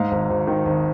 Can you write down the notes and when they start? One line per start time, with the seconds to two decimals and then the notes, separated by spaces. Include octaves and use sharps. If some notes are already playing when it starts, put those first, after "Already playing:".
Already playing: G#2 F5
0.11 G#1
0.30 G#1
0.47 D#3
0.65 G#1